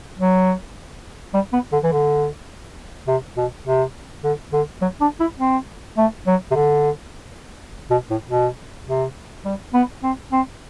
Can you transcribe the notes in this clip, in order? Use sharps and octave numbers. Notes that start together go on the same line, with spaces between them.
F#3
G3
B3
D3
E3
D3
C3
B2
C3
D3
D3
F#3
D4
E4
C4
A3
F#3
C3
D3
B2
A2
B2
C3
G3
B3
C4
C4